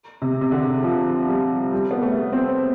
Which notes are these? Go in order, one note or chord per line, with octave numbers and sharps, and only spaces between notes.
C3
C3
D3
F3
G3
G3
B3
A3
C4